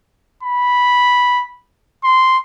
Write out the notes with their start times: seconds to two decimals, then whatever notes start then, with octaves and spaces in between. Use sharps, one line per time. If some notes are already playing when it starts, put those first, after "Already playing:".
0.43 B5
2.04 C6